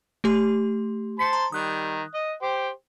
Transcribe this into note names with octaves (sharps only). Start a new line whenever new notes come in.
A3 G4 C6
C5 A5 C6 B6 C#7
A#5
D#3 G3 D#6 F#6
D#5
G4 C5 G5